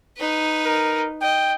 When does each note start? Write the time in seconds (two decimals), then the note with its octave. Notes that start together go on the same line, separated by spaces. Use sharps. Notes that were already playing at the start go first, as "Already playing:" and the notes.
0.17 D#4 B4
0.65 A#4
1.22 D#5 G5